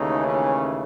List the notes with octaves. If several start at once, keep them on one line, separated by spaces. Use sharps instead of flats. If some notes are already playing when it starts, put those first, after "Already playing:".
Already playing: D#2 C#3 E3 A3 D#4
C#4